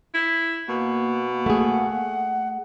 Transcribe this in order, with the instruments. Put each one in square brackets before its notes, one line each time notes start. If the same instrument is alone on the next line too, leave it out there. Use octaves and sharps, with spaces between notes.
[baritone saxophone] E4
[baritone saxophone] B2 [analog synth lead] A#3
[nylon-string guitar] A3 G#4 [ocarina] F#5